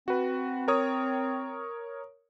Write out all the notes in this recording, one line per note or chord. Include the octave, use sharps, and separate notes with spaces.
C4 F#4 B4
A#4 C#5 D#6